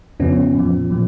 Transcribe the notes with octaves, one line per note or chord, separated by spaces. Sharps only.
F2 C#3 F3 B3 C#4
A#2 F3
A#2 F3